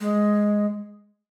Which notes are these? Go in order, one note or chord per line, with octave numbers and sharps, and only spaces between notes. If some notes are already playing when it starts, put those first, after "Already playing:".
G#3